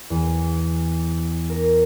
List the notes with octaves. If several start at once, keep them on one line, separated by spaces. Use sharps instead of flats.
E2
A#4